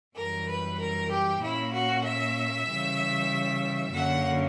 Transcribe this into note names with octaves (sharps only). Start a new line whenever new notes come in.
F#2 E3 G3 A#4
B4
A#4
G4
A#2 A#3 C#4 E4
F#4
E5
C#3 E3 G3
F#2 D3 A#3 C#4 F#5